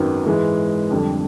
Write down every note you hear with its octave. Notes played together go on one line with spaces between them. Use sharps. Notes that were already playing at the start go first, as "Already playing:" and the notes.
Already playing: G#1 F#2 D#3 F#3 B3
G#2 E3 G#3
F2 D3 G3